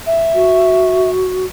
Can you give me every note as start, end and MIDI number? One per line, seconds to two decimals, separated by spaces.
0.06 1.10 76
0.34 1.46 66